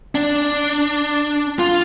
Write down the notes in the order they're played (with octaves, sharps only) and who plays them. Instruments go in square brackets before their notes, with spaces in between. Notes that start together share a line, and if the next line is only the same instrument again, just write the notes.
[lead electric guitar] D4
F4